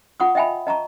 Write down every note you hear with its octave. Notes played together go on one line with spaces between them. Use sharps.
F4 F#5 C#6 D#6
D#5 E5 G5 G#5 B5
D#5 A5 A#5 C#6